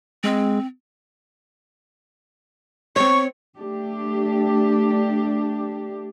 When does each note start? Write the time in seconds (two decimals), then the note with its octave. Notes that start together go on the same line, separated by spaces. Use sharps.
0.24 G#3 C4
2.96 C4 C#5 C#6
3.57 A3 D4 G4